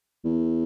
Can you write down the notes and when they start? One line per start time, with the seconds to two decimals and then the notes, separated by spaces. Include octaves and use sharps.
0.25 E2